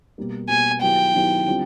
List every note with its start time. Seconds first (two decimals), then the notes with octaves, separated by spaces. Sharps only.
0.18 B2 G3 A#3
0.49 B2 G3 A#3 G#5
0.81 D#3 F#3 B3 E4 G4 G5
1.14 D#3 F#3 B3 E4 G4
1.46 D3 G3 C4 F4